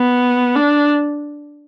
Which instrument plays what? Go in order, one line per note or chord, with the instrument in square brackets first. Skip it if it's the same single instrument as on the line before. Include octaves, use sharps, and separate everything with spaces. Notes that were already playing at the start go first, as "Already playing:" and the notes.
Already playing: [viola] B3
D4